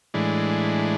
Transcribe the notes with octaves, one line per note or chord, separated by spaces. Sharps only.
A2 E3 G#3 D4